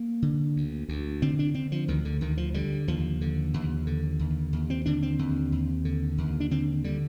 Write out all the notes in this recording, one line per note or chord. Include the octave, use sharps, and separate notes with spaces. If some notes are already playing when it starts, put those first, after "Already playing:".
Already playing: A#3
D3
D2
D2
D3 C4
D4
D3 C4
F3
D2 D#3
D3
D2 D#3
F3
D3 G3
D#2 F3
D3
D#2
D3
D#2
D#2
C4
D3 D4
C4
D#2
D#2
D3
D#2
D4
D3 C4
D3 G3